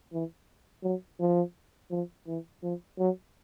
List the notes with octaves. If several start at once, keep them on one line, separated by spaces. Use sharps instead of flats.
E3
F#3
F3
F3
E3
F3
F#3